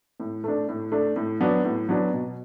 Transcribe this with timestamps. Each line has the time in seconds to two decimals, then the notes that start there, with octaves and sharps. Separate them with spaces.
0.20 A2
0.44 A3 D4
0.68 A2
0.92 A3 D4
1.16 A2
1.41 F#3 B3 D4
1.64 A2
1.89 F#3 B3 D4
2.13 B2